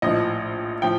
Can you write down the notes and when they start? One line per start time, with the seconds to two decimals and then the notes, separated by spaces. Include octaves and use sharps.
0.02 A#1 A2 F3 D#5
0.82 A2 F3 G5